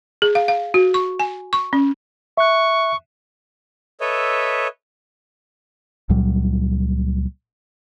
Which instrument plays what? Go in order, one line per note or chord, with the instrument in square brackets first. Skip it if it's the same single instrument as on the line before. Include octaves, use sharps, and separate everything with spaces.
[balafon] G#4
F5
F5
F#4
C#6
G#5
C#6
C#4
[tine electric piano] E5 F#6 [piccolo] C#6
[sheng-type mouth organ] A4 B4 C#5 D#5 E5
[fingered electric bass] C#2 A#2 F#3 G3